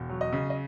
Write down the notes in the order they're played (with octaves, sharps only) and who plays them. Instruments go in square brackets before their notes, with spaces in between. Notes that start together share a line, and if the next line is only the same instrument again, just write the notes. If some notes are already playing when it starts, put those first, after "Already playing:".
Already playing: [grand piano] E1
F#3
[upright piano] D#5
[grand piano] C#3
[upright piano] D#5